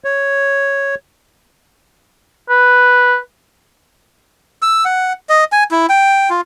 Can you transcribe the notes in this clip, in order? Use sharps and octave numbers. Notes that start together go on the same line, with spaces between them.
C#5
B4
E6
F#5
D#5
G#5
E4
G5
F4